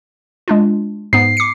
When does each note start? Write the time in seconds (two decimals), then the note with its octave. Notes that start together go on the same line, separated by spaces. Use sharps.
0.48 G#3 D4 F4
1.13 G#2 B3 C7
1.37 D6 C#7